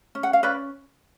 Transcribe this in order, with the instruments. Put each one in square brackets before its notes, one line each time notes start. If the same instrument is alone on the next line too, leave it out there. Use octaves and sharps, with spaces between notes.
[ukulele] C#4
F#5
F5
C#4 B4 D5